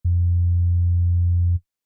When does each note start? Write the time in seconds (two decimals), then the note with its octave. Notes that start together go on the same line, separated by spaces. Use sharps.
0.05 F2